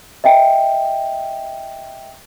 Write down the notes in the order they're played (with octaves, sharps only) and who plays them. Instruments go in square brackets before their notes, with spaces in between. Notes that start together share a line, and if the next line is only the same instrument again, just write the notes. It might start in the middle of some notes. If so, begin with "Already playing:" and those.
[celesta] D#5 E5 G5